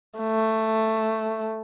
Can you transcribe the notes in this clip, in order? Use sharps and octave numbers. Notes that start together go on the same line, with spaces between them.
A3